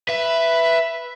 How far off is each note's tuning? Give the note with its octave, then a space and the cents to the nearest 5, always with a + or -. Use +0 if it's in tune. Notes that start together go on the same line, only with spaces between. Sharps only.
B4 +0 E5 +10